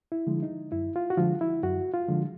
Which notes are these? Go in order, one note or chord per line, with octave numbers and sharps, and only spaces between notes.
E4
D3 F3 G#3
D#4
F#2 E4
F4
F#4
D3 F3 G#3 F4
E4
F#2 F#4
F4
D3 F3 G#3